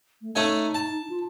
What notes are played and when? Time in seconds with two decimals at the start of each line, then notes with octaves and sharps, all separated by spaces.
0.22 A3
0.35 A3 C#4 D#4 G#5
0.74 A5
1.10 F4